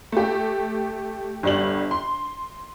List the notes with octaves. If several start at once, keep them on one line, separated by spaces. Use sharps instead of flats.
A3 G4
G1 G3 F#7
C6